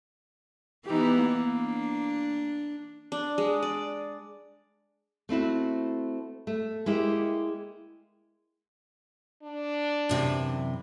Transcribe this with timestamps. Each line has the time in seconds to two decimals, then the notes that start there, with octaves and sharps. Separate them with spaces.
0.86 E3 B3 D#4 G4
1.16 A#3
1.54 D4
3.12 D4
3.38 G#3
3.63 D5
5.29 A3 C4 E4 F#4
6.47 A3
6.86 G#3 A#3 E4 G4
9.43 D4
10.09 F#2 C3 E3